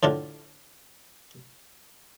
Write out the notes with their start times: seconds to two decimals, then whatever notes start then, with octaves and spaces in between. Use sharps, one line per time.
0.03 A2 D3 D4 F4